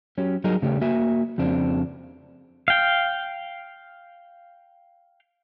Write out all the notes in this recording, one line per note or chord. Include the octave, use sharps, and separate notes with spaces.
F#3 C#4 G4
F#3 G3 D#4 G#4 A#4
C#3 G3 A3 C#4 G4
A#3 F#4 E5 G#5
F2 C#3 C4 D4
F5 G5